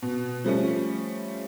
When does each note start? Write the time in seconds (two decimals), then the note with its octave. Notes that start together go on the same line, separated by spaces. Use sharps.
0.02 B2
0.45 F3 G3 A3 C#4